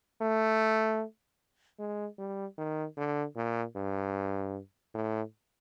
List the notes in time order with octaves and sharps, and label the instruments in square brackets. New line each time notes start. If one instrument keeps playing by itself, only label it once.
[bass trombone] A3
G#3
G3
D#3
D3
A#2
G2
A2